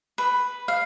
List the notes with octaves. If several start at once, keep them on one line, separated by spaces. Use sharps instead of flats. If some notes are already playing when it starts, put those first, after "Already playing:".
B4
F5